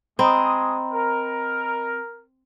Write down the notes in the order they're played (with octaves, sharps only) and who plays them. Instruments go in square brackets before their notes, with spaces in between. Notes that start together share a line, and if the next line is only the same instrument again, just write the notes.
[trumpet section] G#3 D#6 [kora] C4 [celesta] D#5 A#5 B5
[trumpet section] A#4